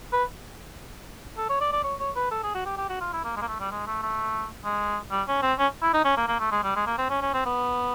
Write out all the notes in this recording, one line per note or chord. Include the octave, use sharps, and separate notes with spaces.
B4
A4
C#5
D5
D5
C#5
C#5
B4
A4
G#4
F#4
G4
G4
F#4
F4
E4
A#3
G#3
A#3
A3
G3
G#3
A3
A3
G#3
G3
C#4
C4
C#4
E4
D#4
C#4
A#3
A#3
A3
G#3
G3
G#3
A#3
C4
C#4
C#4
C4
B3